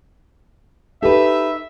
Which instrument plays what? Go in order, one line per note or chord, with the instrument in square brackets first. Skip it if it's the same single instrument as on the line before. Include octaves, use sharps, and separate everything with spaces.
[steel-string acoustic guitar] D#4 B4 [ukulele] G4 A4 [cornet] E5